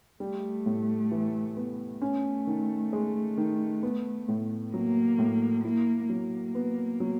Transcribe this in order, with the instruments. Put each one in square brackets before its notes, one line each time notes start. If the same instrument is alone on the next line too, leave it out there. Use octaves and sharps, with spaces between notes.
[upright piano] G3 [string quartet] A3
[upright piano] A2
E3
B3
[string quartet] A3 [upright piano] C#4
[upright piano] D#3
G#3
D#3
B3
A2
[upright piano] F#3 [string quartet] A#3
[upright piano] A2
[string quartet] A#3 [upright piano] E4
[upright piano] F#3 [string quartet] A#3
[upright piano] B3
F#3